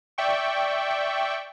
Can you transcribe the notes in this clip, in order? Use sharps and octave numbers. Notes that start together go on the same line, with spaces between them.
D5 E5 G5 C#6